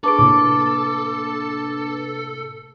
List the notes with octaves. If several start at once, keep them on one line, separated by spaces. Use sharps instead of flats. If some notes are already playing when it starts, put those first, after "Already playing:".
D4 G#4 A4 B4 C#6 D6 D7
A2 C3 A#3 D6